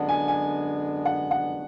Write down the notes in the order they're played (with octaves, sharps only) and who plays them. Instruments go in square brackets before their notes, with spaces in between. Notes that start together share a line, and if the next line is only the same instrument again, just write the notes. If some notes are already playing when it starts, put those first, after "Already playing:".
Already playing: [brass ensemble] F#2 D3 G#3 B3 D4 [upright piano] F#5 A5
[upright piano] G#5
G#5
F#5
F#5